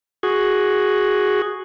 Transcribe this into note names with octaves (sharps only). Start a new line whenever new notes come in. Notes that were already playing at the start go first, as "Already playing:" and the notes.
F#4 G#4